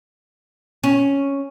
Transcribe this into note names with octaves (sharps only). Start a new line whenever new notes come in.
C#4